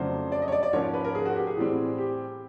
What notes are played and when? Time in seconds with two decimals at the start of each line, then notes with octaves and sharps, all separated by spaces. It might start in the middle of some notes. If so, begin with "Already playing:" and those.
Already playing: F2 C#3 F#3 A3 D4 C5
0.32 D5
0.42 D#5
0.48 C#5
0.52 D5
0.63 D5
0.73 G#2 F3 A#3 C#4 C#5
0.94 B4
1.04 A#4
1.15 G#4
1.26 F#4
1.36 G4
1.47 G#4
1.56 A2 E3 G3 C4
1.98 G4